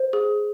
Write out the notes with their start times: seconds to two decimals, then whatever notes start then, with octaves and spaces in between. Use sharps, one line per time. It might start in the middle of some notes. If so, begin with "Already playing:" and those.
Already playing: C5
0.13 G#4